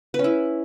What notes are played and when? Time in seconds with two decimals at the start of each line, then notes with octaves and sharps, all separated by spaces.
0.14 B4
0.19 C#4
0.24 E4